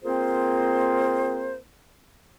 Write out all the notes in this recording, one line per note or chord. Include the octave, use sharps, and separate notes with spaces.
A#3 C4 F4 G#4 C5